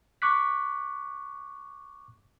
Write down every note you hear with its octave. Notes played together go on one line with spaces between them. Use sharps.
C#6 D6 F#6 B6